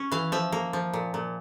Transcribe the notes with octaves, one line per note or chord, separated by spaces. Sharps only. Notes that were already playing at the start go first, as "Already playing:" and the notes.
Already playing: C#4
E3 F5
F3 E5
A#3
F3
A#2
A#2